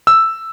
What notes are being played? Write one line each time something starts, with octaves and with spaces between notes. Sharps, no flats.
E6